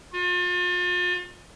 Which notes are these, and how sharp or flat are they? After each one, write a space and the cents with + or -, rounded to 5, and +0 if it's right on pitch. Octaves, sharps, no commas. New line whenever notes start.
F4 +40